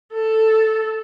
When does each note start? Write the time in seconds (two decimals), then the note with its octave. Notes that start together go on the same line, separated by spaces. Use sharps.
0.13 A4